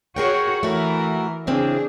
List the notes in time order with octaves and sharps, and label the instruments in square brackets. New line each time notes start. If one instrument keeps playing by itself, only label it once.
[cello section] F#4 C#5 [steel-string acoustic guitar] G#4 A#4 G5
[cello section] E3 E4 A#4 [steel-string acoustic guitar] A3 F#4
[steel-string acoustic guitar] C#3 E3 C4 [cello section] D4 G#4